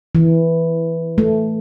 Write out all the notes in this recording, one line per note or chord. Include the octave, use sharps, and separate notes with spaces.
E3
A3